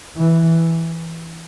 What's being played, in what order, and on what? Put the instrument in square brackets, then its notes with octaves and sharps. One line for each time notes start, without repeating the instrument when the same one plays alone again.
[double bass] E3